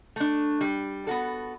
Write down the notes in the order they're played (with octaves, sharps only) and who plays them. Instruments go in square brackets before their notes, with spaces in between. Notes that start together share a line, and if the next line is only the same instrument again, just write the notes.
[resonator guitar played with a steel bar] A3 D4
G3
B3 F#4 A4